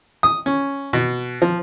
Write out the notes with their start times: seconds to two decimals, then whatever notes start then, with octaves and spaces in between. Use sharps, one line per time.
0.23 D#6
0.46 C#4
0.93 B2
1.42 F3